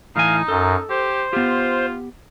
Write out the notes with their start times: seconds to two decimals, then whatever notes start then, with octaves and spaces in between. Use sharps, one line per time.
0.16 A2 E3 D#4 F5 G#5
0.48 F#2 A4
0.89 G4 C5
1.33 B3 F4 G4